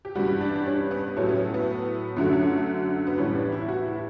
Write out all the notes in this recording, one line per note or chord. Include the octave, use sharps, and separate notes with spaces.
G4
G2 E3 G3 F#4
D4
D4
C#4
B3
A2 F#3 A3 C#4
B3
B3
F#2 D3 F#3 A3
B3
A2 E3 G3 C#4
D4
E4
F#4
E4